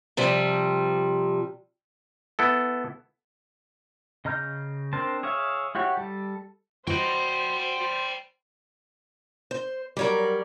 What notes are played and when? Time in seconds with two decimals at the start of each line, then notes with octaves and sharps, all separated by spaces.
0.17 C3 F3 G3
2.39 B3 E4 A4
4.25 C#3 D#5 A#5 F6 G6
4.93 C4 D4 A#4 C5 A5
5.23 G#4 C#5 E5 F5
5.75 E4 F#4 G4 C#5
5.97 G3 A4
6.87 F#4 C5 D#5 G5 B5
9.51 C5
9.97 F#3 G3 A#4 C#5 D5